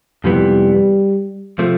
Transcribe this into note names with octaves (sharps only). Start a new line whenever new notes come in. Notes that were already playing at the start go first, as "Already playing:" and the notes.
F2 C3 E3 G3 B3
C3 F3 A3